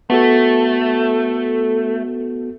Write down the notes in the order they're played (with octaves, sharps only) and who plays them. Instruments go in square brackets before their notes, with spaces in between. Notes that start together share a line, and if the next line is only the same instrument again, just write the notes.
[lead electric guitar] A3 [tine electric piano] B3 F#4 A4